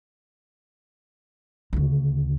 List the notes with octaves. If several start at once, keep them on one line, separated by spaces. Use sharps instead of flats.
D2 C#3